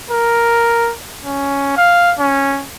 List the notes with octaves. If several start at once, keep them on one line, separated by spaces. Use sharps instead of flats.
A#4
C#4
F5
C#4